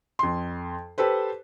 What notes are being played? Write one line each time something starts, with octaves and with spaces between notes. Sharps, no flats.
F2 C6
G4 A4 B4 C5